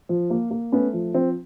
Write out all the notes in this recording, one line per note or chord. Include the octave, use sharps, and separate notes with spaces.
F3
A#3
A#3
A3 B3 C#4
F3
F3 C4